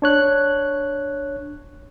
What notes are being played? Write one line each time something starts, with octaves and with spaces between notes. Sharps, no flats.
D4 C#5 F#6